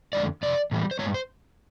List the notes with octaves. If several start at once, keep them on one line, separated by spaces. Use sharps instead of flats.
F2 D3 F3 G#3 D5
F2 C3 D5
A2 E3 G3
C5
G2 E3 G#3 C#5
C5